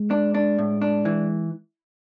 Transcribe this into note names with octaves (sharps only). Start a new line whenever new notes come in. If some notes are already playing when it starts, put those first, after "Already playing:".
Already playing: G#3
D4
D4
A2
D4
E3